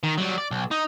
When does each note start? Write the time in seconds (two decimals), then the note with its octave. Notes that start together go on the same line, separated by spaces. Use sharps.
0.03 D#3
0.18 F#3 G3
0.38 D5
0.51 B1
0.71 D#4